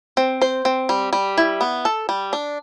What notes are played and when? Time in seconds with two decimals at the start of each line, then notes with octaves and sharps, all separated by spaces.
0.17 C4
0.42 C5
0.65 C4
0.89 G3
1.13 G3
1.38 E4
1.61 B3
1.85 A4
2.09 G3
2.33 D4